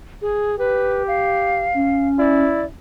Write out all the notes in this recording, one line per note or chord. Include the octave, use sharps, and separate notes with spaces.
G#4
G4 B4
F5
C#4
E4 D5